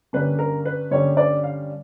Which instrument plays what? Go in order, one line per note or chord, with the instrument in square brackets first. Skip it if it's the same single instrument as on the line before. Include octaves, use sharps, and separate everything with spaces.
[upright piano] G2 D3 G3 A#3 C#4 B4
A#4
B4
G2 D3 G3 A#3 C#4 C#5
D5
F5